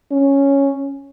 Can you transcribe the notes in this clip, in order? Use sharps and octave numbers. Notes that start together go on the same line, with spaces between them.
C#4